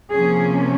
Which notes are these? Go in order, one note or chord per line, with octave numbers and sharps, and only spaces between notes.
C3 F3 A#3 C#4 G#4